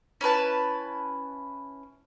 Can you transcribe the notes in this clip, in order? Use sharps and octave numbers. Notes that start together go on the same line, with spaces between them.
C#4 E4 B4 A5